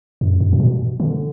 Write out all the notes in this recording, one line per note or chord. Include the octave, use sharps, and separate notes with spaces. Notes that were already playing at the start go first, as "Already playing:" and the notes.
F#2
F#2
A2
B2
D3